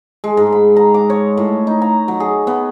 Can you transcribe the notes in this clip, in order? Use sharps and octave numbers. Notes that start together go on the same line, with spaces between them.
G#3
G#2
B5
A#5
D6
C#5
A2
D#4
A#5
F#3
G#4
B3